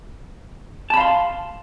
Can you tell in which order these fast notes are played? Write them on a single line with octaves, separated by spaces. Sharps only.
A5 B5 F5 C6